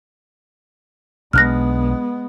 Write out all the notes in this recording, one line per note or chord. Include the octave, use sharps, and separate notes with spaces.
B1 G#3 B3 D4 F6 F#6 A#6